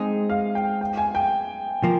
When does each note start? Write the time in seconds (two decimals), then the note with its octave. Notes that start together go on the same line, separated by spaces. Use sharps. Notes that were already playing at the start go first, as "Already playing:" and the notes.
Already playing: G#3 C4 D#4 G#4
0.30 F5
0.55 G5
0.81 G5
0.97 G#5
1.15 G5
1.84 F3 A#3